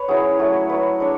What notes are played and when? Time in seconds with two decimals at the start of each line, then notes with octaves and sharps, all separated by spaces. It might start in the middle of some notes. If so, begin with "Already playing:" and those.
Already playing: B4 C#5
0.08 F#3 C#4 E4 G#4
0.39 F#3 A3 E4
0.69 F#3 A3 E4 B4
1.00 G#3 D4 C#5